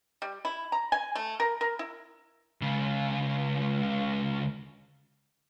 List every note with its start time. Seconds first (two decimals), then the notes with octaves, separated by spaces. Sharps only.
0.22 G3
0.45 E4
0.72 A#5
0.92 G#5
1.15 A3
1.40 A#4
1.61 A#4
1.79 E4
2.62 C#2 C#3